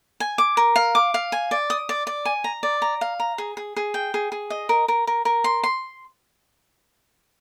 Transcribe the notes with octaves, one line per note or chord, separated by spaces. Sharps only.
G#5
D6
A#4
F5
D6
F5
G#5
D5
D#6
D5
D5
G#5
A#5
D5
A#5
F5
A#5
G#4
G#4
G#4
G5
G#4
G#4
D#5
A#4
A#4
A#4
A#4
C6
C6